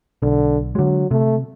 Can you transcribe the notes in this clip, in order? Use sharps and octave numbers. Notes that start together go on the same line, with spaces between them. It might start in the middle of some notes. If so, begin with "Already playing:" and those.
B1 D3
D3 F#3 G#3
C3 A3